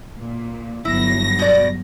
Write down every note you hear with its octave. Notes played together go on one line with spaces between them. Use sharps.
A#2
G1 F#3 E4 A#6
B2 D5